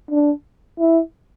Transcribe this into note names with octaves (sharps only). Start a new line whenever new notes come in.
D4
E4